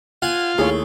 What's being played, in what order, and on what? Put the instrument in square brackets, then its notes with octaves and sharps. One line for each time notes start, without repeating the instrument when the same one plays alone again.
[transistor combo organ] F4 [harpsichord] F#5 G#5
[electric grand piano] D#2 E4 [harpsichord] A3 [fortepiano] G#4 C#5